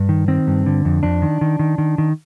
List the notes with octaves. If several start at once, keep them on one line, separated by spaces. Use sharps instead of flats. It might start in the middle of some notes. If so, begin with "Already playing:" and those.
Already playing: G2
D#3
D#3 C4
G2
D3
F2
F2 D4
D#3
D#3
D#3
D#3
D#3